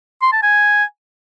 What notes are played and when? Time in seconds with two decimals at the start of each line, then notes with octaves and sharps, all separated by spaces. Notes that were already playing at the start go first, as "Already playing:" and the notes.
0.22 C6
0.32 A5
0.43 G#5